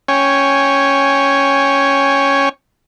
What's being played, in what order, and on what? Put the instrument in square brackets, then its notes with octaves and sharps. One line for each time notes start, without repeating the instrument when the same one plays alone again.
[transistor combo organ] C#4 C#5 G5 G#5